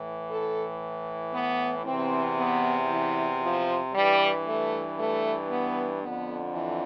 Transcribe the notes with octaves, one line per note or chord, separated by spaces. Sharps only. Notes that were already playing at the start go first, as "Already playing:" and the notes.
Already playing: A2 E3
A4
B3
E2 C3 E3 C4
B3
E3
F3
G2 E3 G3
A3
A3
B3
F2 D3 B3
E3